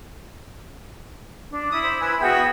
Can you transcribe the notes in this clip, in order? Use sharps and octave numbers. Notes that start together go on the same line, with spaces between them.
D4
E4 D#6
C5
B4 G#5
B3 F#4 G#4 E5 G5